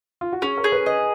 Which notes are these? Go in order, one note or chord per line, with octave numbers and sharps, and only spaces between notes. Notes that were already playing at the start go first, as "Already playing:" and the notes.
F4
F#4
C#4 G#4
A#4
G#4
B4
B4 D#5